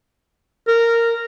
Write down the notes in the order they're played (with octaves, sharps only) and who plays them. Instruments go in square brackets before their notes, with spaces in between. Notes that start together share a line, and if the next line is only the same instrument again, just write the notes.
[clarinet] A#4